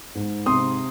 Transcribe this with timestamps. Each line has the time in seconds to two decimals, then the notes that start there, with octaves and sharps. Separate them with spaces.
0.15 G#2
0.46 C3 C6 D#6